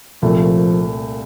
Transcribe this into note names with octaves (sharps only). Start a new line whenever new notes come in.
C2 A#2 F3 A3